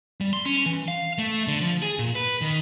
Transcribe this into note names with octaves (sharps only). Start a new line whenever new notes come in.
G3
C6
C#4
E3
F5
A3
D3
F3
G#4
A#2
B4
D#3